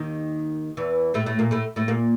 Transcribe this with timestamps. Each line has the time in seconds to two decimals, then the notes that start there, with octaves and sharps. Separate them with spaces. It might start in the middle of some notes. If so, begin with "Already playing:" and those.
Already playing: D#2 D#3
0.77 E2 E3
1.14 A2 A3
1.26 A2 A3
1.39 A#2 A#3
1.51 A2 A3
1.76 A2 A3
1.88 A#2 A#3